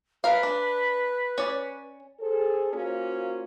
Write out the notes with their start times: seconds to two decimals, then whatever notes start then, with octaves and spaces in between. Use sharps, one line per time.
0.24 A#4 B4 F5
0.43 D4
1.38 C#4 D5
2.20 G#4 A4 C5
2.72 A#3 C#4 F4 F#4 A#4 C5